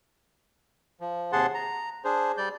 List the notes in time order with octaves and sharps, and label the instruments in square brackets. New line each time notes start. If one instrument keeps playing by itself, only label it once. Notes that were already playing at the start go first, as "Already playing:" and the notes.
[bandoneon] F3
D#2 C3 G#4 F#5 A5 C6
A#5
D4 G#4 C5
G3 D5 G6